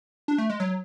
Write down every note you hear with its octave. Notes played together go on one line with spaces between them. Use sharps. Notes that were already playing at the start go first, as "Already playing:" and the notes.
D4
A3
G#3
F#3